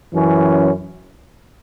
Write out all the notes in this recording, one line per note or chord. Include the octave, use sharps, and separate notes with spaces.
F#2 E3 C#4